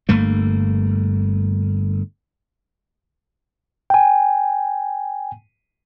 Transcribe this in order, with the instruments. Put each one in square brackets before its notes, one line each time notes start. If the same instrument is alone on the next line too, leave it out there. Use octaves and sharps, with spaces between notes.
[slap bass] G1 G2 A3 A#3
[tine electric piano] G5 G#5